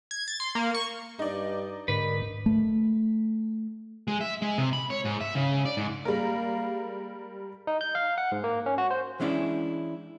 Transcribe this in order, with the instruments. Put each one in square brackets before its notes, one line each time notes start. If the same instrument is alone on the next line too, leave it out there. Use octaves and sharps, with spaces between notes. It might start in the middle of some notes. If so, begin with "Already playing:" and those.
[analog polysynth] G#6
A6
C6
A#3
C#6
[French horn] G2 [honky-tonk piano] D#4 D5
[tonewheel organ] G#2 D3 [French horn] A#4 [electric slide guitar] B4
[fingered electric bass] A3
[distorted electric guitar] G#3
E5
G#3
C3
B5
C#5
G#2
E5
C#3
D5
G#2
[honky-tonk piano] G3 G#3 A#4 [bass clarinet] A#3
[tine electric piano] D#4
G6
F5
F#5
G#2
A#3
C#4
F#4
C5
[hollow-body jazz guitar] E3 G#3 C#4 D4 E4